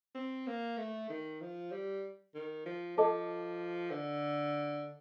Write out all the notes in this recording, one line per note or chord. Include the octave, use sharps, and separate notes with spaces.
C4
A#3
A3
D#3
F3
G3
D#3
F3
F3 A4 D#5 A5 D6
D3